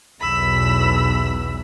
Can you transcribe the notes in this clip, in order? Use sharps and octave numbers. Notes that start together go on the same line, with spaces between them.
B1 E2 E3 B5 E6